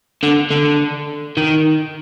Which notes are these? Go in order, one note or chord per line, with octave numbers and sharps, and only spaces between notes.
D3
D3
D#3